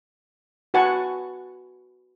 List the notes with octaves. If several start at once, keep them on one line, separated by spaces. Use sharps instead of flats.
F#4 B4 F#5 G#5 A5 C#6